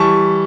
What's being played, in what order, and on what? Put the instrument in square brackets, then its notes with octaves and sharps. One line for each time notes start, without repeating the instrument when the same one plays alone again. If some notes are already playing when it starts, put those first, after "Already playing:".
Already playing: [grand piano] E3 G3 A5 C#6